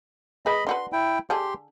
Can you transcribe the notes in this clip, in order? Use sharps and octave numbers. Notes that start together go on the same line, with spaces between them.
G#3 B4 D#5 B5
D4 F#4 B4 C6
E4 G5
D3 G4 G#4 A5 C6